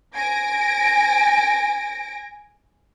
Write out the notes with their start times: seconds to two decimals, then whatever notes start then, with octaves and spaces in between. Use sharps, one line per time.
0.15 G#5 A#6 D7